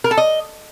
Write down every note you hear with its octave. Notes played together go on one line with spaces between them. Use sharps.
A#4
A4
D#5